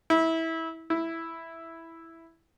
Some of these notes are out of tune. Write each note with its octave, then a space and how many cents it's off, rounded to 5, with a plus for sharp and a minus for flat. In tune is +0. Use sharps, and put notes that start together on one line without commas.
E4 -20
E4 +0